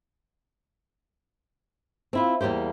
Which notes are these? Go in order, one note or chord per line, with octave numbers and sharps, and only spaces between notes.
C4 E4 F4
E2 G3 A#3 G4 C5